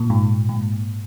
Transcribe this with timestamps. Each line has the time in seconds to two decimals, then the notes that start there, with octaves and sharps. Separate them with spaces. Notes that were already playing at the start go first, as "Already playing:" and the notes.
Already playing: A#2
0.10 G#2
0.49 G#2